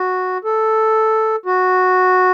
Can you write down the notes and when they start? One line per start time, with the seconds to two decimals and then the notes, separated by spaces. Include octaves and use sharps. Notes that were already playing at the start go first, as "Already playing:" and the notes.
Already playing: F#4
0.44 A4
1.46 F#4